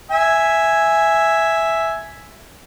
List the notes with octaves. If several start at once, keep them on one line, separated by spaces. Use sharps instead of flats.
E5 G#5